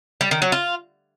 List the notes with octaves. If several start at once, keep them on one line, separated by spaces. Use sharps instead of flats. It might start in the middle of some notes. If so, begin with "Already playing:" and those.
G3
D#3
F#3
F4